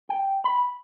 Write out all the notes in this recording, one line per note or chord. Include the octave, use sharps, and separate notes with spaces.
G5
B5